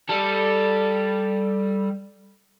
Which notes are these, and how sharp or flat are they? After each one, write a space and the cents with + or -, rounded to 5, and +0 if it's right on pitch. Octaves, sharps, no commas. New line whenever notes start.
G3 +0 A4 +0